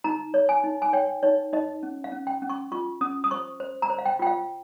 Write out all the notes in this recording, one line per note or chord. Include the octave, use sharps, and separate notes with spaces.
D#4 A#5
C#5
G#5
D#4
G#5
C#5 G5
D#4 C#5
D#4 D#5
C#4
F5
C#4
G5
C#4
C#6
F4 C#6
C#4 D#6
D#6
C5 C#6
C5
A#5
C5
F5
G5
F4 G5
F5